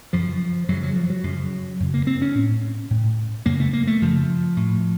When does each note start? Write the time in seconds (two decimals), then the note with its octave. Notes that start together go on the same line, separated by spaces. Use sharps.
0.13 F#2 C#3 F3
0.68 F#2 C#3 F#3
0.83 F#3
0.96 F3
1.10 F#3
1.23 F#2 C#3
1.80 F#2 C#3
1.94 A#3
2.07 C4
2.22 C#4
2.35 A2
2.90 A2
3.46 F#2 C#3 A#3
3.60 A3
3.73 A#3
3.87 A3
4.01 F#2 C#3 F3
4.57 A2